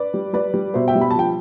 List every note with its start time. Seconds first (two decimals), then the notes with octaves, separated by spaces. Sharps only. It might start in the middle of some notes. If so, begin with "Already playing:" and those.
Already playing: B4 D5
0.14 G3
0.33 G3 B4 D5
0.54 G3
0.74 B2 C5 E5
0.88 E5 G5
0.95 G3
1.01 B5
1.11 A5
1.15 F3 G5